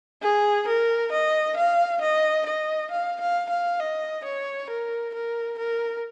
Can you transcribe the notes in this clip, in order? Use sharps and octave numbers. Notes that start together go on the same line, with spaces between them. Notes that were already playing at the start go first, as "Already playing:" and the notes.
G#4
A#4
D#5
F5
D#5
D#5
F5
F5
F5
D#5
C#5
A#4
A#4
A#4